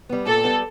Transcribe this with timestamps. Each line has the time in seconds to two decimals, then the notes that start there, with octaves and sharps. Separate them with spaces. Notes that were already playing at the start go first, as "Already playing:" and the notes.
0.09 G3 B3
0.26 A#2 A4
0.44 G3 B3